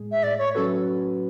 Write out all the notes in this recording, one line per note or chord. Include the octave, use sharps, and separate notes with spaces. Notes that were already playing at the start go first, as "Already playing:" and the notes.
Already playing: A2 G#3 G#4
E5
A2 D5
C#5
F#3 C#4 F#4 A4 B4